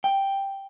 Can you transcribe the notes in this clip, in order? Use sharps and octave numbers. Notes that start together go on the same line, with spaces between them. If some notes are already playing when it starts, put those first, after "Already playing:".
G5